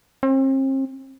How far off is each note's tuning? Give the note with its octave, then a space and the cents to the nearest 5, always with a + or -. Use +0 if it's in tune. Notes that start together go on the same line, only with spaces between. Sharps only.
C4 +40